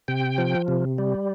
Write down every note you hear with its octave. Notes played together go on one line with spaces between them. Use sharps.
C3 G5
F3
C3
G3